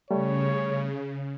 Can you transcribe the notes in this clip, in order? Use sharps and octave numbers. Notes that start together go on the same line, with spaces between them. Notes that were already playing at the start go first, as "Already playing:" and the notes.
C#3 G3 A3 C#5